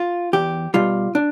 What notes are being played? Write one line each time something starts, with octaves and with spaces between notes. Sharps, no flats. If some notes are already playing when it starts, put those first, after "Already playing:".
Already playing: F4
E2 G4
B2 G3 F4
D4